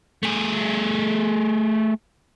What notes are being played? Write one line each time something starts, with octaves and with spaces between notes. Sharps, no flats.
A3 G#4